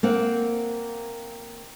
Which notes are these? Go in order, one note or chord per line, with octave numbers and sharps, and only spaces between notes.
A#3 C4 F#5